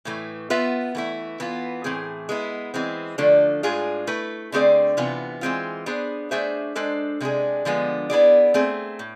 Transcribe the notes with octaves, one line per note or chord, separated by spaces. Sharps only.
A2 E3 A3
B3 F4 B4 E5
E3 A3 E4
E3 B3 F4
A2 E3 A3 C4 G#4
G#3 B3 E4
E3 G#3 C4
D3 F3 A3 D4 A4
A2 G#3 D4 F4 G#4
A3 E4 B4
D3 A3 C4 G#4 D5
C3 E3 B3 F4
E3 G#3 C4 F4
B3 D4 G#4 C5
A3 D4 G#4 C5 E5
G#3 D4 A4 C5
C3 G#3 D4 G#4
D3 F3 G#3 B3
B3 E4 G#4 D5
A3 C4 G#4
A2